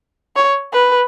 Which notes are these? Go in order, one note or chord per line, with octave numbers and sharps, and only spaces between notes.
C#5
B4